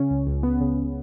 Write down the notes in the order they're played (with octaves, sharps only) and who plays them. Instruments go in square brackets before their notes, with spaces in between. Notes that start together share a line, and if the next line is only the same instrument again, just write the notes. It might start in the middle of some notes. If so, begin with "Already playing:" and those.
Already playing: [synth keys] C#3 C#4
C#2
C#2
C#2 B3
C#3
C#3